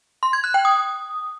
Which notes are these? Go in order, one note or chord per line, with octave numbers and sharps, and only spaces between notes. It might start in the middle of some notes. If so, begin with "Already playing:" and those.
C6
G#6
F#6
G5
D#6